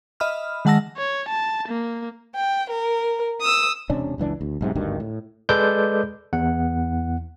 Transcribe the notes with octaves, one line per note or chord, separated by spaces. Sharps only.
D#5 E5 B5 D#6 F6
D#3 G#3 F#5 A5 E6 A#6
C#5
A5
A#3
G5
A#4
D#6 E6
E1 C3 C#4 D4
F#1 C#2 E3 D4
D2
B1 G#2 C3
G#1 D2 G2 D#3
A2
G#3 A4 B4 D5 D6 G6
E2 F#5